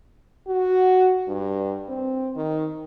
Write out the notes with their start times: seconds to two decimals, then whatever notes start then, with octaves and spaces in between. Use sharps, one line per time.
0.48 F#4
1.28 G2
1.89 C4
2.36 D#3